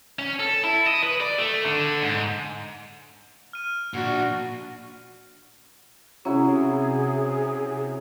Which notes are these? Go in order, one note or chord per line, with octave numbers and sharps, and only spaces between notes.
C#4
A4
E4
D#5
B4
D5
A3
D3
G#2
F6 D#7
A#2 D4 F#4
C3 F#3 C#4 E4 G#4